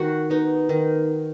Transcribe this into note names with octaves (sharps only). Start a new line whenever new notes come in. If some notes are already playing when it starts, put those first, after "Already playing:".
Already playing: D#3 F#4
B3 D#4
D#3